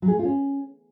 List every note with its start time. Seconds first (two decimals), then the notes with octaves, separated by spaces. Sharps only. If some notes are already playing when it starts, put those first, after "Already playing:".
0.02 F#3
0.08 G#4
0.14 A3
0.19 F4
0.25 C#4